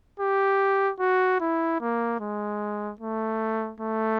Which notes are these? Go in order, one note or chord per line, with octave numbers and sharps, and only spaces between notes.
G4
F#4
E4
A#3
G#3
A3
A3